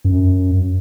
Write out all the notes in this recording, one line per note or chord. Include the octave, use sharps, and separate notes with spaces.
F#2